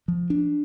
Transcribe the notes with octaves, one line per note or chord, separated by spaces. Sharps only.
F3
D4